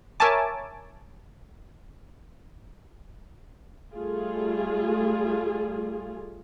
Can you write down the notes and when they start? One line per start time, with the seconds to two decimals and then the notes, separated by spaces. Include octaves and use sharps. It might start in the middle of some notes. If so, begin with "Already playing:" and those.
0.20 A#4 C#5 E5 G#5 A5 D6
3.95 G3 A3 F4 G#4